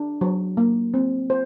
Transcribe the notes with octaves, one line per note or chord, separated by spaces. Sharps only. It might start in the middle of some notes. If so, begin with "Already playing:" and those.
Already playing: D4
F#3
A#3
C4
C5